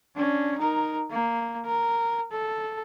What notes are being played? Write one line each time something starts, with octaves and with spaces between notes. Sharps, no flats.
C#4 D4
D#4 A#4
A#3
A#4
A4